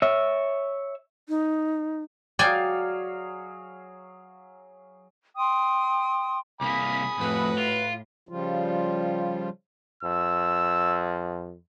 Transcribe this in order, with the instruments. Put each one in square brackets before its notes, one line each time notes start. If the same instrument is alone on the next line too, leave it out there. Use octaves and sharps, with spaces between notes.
[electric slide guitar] C#5 E5
[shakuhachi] D#4
[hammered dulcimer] F#3 G#4 F5 [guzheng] D5 G5 G#5
[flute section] G5 C6 D#6
[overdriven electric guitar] C2 A#3 [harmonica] G#5 B5 D#6 [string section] B6
[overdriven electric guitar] F2 [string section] A2 [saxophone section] F#4 B4
[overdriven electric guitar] F4
[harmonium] C#3 F3 G3 F4
[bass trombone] F2 [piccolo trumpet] E6